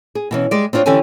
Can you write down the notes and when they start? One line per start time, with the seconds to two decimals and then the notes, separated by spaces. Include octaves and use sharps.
0.15 G#4
0.31 B2 E3 C#4
0.51 G3 G#3 D5
0.73 C4 D4 F4 C#5
0.86 D3 E3 C#4 G4 A4 G#5